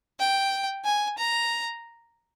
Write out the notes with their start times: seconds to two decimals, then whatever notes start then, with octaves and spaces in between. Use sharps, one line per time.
0.19 G5
0.85 G#5
1.18 A#5